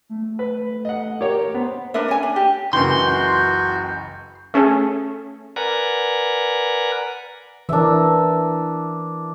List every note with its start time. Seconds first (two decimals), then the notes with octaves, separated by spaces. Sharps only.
0.09 A3
0.39 B4
0.85 D#5 F#5
1.21 G4 A#4 C#5
1.54 B3 C5
1.94 D4 A#4 B4 E5
2.08 C#4 G#5
2.23 D4
2.36 G4
2.73 F#1 C#2 E3 F#4 C6 G6
4.54 A3 C#4 G#4 A4
5.56 A#4 B4 D5 F#5 G#5 A#5
7.69 E3 D4 A#4 E5